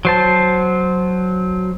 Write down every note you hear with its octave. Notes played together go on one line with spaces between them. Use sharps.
F#3 C5 A5